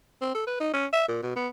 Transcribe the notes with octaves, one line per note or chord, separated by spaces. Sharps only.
C4
A4
B4
D#4
C#4
E5
A#2
B2
B3